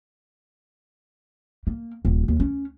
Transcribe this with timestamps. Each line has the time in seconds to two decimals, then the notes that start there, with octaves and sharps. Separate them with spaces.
1.67 A#3
2.05 D#1
2.28 D#2
2.40 C#4